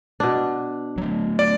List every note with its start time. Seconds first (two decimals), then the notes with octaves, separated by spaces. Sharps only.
0.20 B2 D4
0.98 F#3 A3
1.39 D5